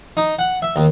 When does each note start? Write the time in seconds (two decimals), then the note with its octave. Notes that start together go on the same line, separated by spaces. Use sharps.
0.17 D#4
0.39 F#5
0.62 E5
0.76 D#2